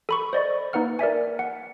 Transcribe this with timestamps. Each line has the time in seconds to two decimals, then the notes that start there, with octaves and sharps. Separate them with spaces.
0.09 A4 B5 C#6
0.33 C5 D5 D#5 C#6
0.73 A#3 D#4 B4 F#5 F6
0.99 A#4 D5 E5 G#5
1.39 F#5